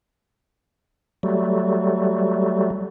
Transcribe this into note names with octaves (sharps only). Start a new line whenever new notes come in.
F#3 G3 A3